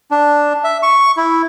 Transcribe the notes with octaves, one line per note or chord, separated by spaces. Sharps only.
D4
E5
C#6
E4